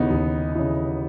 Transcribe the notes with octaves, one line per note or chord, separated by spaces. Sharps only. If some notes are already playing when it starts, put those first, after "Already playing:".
Already playing: D#2 C#3 E3 B3 D#4
D#2
C#3 E3